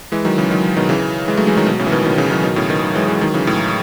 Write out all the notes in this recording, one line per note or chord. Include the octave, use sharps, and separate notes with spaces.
E3 G#3
D#3 F#3
C#3 E3
D#3 F#3
B2 D#3
C#3 E3
E3 G#3
F#3 A3
E3 G#3
D#3 F#3
B2
A2 C#3
E3
B2 D#3
B2 D#3
C#3 E3
D#3 F#3
B2 D#3
A2 C#3
B2 D#3
D#3 F#3
E3 G#3
E3 G#3
D#3 F#3
C#3 E3
A2